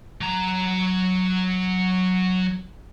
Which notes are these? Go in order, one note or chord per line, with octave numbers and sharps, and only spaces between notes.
F#3 A#5